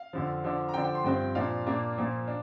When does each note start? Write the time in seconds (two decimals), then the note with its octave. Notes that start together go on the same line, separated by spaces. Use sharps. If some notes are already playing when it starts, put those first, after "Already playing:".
Already playing: F5
0.13 F2 D3 F3
0.44 D3 F3 D4
0.69 A#5
0.74 D3 F3 D4 G5
0.84 G5
0.95 C6
1.04 G2 F3 C4 G5
1.35 A#2 F3 D4 F5
1.67 A#2 A#3 D4
1.98 A#2 F3 A#3
2.27 D4